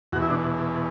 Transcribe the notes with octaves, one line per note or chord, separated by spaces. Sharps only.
E2 B2 F#4
E4
D4